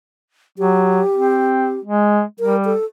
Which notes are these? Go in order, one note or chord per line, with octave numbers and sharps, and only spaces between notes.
F#3 G4
C4
G#3
G3 A#4
A4